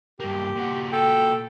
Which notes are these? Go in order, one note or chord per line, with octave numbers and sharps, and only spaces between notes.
G2 A#3 G4
A#2 F#4
A4 G5